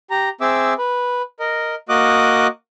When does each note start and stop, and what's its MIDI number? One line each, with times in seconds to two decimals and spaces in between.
0.11 0.29 67
0.11 0.29 82
0.41 0.73 60
0.41 0.73 68
0.41 0.73 76
0.41 0.73 86
0.41 0.73 88
0.78 1.22 71
1.40 1.75 70
1.40 1.75 75
1.89 2.47 58
1.89 2.47 66
1.89 2.47 75
1.89 2.47 86
1.89 2.47 87
1.89 2.47 90